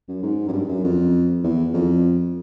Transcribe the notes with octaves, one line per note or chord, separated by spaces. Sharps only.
F#2
G#2
F#2
G2
F#2
F2
E2
F2